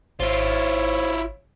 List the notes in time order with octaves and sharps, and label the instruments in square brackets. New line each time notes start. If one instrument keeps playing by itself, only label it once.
[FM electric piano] G#1 [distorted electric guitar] E4 F4 [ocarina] C5 [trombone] C#5